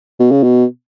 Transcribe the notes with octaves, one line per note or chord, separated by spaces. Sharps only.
B2
C#3
B2